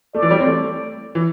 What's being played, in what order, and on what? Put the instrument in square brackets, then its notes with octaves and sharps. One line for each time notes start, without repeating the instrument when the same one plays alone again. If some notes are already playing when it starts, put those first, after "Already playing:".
[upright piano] A3 [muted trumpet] D5
[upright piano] E3
G3
C4
A3
E3